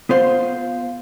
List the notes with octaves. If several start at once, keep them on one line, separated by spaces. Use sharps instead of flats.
B3 F4 C5 F5 C6